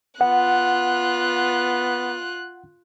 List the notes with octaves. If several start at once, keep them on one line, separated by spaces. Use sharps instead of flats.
B3 F4 F#5 F#6